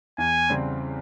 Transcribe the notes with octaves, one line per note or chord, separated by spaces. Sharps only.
E2 G#5
C#3 G3 C4